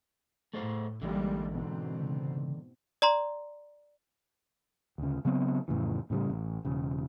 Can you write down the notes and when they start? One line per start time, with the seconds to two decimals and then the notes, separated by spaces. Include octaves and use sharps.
0.53 A2 A3 G#4 C5
1.02 A1 D3 E3 G3 G#3 A#3
1.52 G#2 B2 C4
2.00 C#3
3.02 D5 A#5 C6
4.98 D2 C#3
5.25 C#3 F#3 B3 C4
5.68 F2 A2 C#3 E3
6.10 A2 C#3 E3 G3
6.30 A1
6.65 E1 C#3